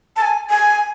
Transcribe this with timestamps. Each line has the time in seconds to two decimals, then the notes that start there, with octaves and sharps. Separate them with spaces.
0.16 A5
0.22 G#5
0.50 G#5